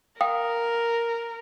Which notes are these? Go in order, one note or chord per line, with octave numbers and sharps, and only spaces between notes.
A#4 F5 G5 D#6